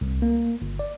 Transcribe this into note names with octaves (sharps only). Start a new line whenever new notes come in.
C2
A#3
G1
D5